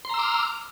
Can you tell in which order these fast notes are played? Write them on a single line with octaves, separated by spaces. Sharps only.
C6 A#5 E6 D6 F6